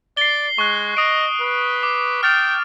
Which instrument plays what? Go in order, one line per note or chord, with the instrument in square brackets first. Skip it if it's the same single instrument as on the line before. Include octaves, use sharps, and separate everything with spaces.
[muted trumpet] D5 [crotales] C7 G7
[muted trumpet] G#3 [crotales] C#6 F#6
[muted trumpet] D#5 [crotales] D#6 D7
[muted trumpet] B4
[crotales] D6
[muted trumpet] G5 [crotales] F6 A6 F7